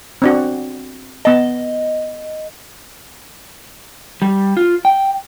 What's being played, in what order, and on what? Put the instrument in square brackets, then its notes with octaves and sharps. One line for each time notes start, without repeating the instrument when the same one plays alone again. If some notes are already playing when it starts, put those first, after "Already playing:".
[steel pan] C4 D4 F#4
[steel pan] B3 A5 [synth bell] D#5
[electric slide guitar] G3
F4
G5